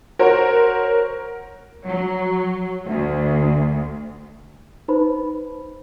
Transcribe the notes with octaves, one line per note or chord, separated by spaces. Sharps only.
F#4 A#4 C5 C#5
F#3
D2
D#4 B4 C5 B5